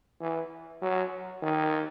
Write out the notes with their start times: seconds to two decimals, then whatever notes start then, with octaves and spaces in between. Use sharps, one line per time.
0.21 E3
0.82 F#3
1.43 D#3